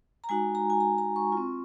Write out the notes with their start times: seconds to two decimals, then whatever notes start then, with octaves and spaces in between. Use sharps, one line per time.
0.24 A#5
0.29 G#3 D#4 F#4 G#5
0.55 A#5
0.70 G#5
0.80 A#5
0.98 A#5
1.16 C#6
1.32 C4 F4